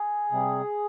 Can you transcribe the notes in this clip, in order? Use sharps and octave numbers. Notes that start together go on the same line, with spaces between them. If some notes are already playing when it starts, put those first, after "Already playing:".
Already playing: G#4
C3 G3